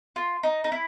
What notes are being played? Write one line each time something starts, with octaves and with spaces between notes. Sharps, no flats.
F4
D#4
D#4
E4